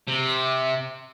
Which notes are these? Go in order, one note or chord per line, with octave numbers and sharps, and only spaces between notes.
C3